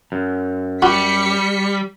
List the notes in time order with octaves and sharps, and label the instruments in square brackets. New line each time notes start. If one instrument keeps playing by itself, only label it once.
[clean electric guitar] F#2
[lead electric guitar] G3 [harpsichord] F#4 [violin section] B6 C#7